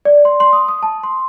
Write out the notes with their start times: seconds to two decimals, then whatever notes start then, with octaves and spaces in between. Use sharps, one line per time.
0.05 D5
0.25 C6
0.40 C6
0.53 D#6
0.68 D#6
0.83 A5
1.03 C6